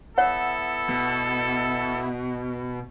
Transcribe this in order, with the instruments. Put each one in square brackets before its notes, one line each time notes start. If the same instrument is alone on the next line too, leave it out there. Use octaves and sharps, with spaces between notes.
[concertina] B3 E4 E5 [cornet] A4 [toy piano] C#5 F#5
[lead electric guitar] B2